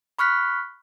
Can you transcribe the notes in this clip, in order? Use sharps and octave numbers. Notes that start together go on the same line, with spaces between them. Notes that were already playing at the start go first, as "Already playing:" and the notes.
B5 C#6 F6 F#6 B6